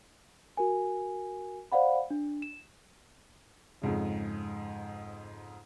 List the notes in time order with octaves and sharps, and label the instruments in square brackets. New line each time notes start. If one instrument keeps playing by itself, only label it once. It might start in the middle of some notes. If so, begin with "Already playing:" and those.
[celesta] F#4 A#4 G#5
C5 D5 F5 F#5 B5
D4
E7
[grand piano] F2 G#2 C#3